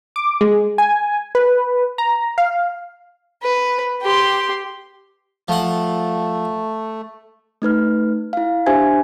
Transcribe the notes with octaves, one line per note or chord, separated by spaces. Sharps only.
D6
G#3
G#5
B4
A#5
F5
B4
G4 C6
F3 A3 F#5
A3 D#4 B4 F6
E4 F5
D4 G4 C5 E5 G#5 G#6